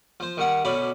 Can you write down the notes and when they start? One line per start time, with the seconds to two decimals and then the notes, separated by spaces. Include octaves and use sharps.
0.20 F3 C5
0.37 D#3 G3 F#5
0.65 D2 B2 C#4 D5 B5